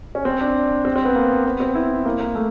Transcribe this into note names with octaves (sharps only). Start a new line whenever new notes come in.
C#4
C4
D4
C4
C4
B3
A#3
B3
C4
E4
A#3
A#3
A3